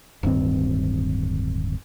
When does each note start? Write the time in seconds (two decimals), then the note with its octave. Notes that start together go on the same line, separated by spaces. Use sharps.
0.23 D1 G2 D#3 C4